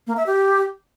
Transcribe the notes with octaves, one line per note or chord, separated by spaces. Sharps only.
A#3
E5
G4